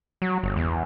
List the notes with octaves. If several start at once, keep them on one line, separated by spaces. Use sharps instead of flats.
F#3
G1
E2